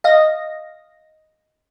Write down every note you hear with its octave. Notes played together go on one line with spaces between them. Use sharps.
D#5 F5 A#6